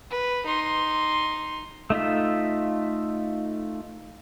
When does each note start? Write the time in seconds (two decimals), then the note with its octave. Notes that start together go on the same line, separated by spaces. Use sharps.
0.10 B4
0.46 D#4 C6
1.90 A3 D#4 F4 E5